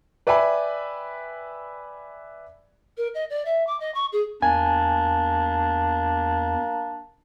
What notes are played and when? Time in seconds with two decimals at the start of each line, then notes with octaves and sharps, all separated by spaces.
0.27 B4 D5 E5 G5 G#5 B5
2.97 A#4
3.14 D#5
3.29 D5
3.45 E5
3.66 D6
3.80 D#5
3.94 C#6
4.12 G#4
4.42 E2 A#3 D4 G#5